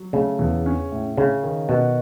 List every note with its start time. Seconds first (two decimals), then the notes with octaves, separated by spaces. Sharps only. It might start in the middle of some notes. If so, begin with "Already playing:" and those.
Already playing: F#3
0.13 C#3 A3
0.39 E2
0.66 C#4
0.92 A2
1.17 C#3 C#4
1.43 D#3
1.69 B2 F#4